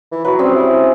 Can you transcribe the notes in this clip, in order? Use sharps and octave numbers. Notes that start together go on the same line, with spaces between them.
E3
F#3 B4
G3 C4 C#4 G#4
E4